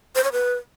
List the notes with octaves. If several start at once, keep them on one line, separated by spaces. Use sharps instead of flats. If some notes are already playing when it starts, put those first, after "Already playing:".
C5
C#5
B4